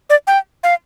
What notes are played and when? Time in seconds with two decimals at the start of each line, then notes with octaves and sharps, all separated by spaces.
0.10 D5
0.27 G5
0.63 F5